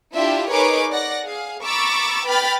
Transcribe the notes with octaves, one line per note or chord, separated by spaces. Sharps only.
D4 E4 F4 G4 E5
D#4 G#4 A#4 B4 C#5 D6
D5 F#5 A#6
G#4 F5
A#5 B5 C#6 D6 E6 A6
B4 G5 B5 F6 A6